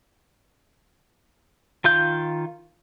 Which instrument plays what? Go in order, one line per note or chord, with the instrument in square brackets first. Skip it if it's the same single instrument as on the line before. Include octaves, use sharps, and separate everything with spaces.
[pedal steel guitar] D#3 F4 F5 G6